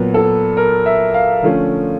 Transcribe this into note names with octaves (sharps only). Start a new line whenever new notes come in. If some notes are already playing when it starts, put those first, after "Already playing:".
Already playing: A#2 F#3 B3
A4
A#4
E5
F5
D3 F3 A3 C#4